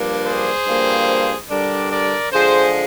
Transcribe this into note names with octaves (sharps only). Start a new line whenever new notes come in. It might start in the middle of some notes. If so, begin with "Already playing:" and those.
Already playing: G2 F3 A#3 D4
G#4 C5
G2 F3 A#3
G2 D3 G3 D4 A#4 D5
A#4 D5
D3 F3 G#3 G#4 C5